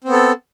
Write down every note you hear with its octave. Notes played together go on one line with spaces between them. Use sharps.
B3 C4 A4